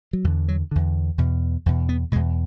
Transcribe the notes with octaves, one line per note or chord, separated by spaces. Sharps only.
F#3
E2 D3 E3
F#3
E2 D3
E2 B2
E2 B2
B3
E2 B2 G#3